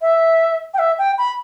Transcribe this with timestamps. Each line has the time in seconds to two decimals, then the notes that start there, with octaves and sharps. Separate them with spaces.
0.02 E5
0.74 G5
0.78 E5
0.98 G5
1.18 B5